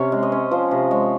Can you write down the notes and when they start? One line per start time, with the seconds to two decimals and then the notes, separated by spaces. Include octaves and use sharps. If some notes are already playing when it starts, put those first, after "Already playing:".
Already playing: C3 C#4 C#5
0.12 G#3
0.23 D#5
0.32 C#4
0.51 F3 C5
0.71 C3 D#5
0.91 G#3 C#5